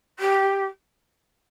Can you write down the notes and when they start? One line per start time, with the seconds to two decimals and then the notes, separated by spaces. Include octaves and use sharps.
0.19 G4